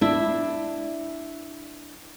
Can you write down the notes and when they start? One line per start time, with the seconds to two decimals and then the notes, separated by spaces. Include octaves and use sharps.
0.01 D4 E4